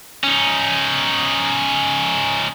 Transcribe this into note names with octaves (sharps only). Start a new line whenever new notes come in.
C#4 D#4